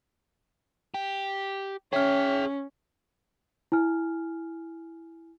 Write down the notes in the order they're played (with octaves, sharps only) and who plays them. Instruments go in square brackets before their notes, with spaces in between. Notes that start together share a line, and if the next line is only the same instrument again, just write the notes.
[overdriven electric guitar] G4
[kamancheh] C#4 [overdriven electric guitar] G#4 G5 [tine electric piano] C#5 E5 F6
[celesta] E4 G#5 F6